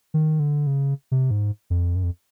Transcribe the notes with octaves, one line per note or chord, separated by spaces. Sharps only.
D#3
D3
C#3
C3
G#2
F2
F#2
F2